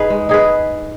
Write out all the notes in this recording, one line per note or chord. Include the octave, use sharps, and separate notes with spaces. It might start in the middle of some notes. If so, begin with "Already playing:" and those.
Already playing: D#4 G#4 B4
G#3
D#4 G#4 B4